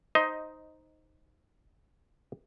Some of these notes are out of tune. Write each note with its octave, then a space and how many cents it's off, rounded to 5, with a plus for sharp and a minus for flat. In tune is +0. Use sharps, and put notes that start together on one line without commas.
D#4 +0 C5 +0 D#5 +10